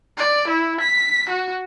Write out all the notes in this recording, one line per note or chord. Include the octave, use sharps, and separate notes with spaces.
D5
E4
B6
F#4